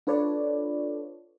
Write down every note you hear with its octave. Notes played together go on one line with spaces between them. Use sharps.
D4 F4 A4 B4 C#5 D5